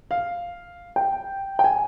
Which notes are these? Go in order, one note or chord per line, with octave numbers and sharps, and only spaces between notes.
F5
G5
G5
G#5